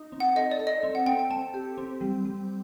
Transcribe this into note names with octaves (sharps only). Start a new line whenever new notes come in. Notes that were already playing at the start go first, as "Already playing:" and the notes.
Already playing: D#4
C4
F#5
A4 D#5
D5
A4
D#5
C4 D#5
F#5
C4 G5
G5
C4 A5
G4
C4
G3
G3